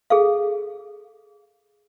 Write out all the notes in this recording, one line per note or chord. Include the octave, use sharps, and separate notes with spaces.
G#4 A4 F5